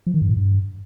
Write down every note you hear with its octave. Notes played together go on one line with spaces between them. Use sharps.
F3
D#3
G2
A2
G2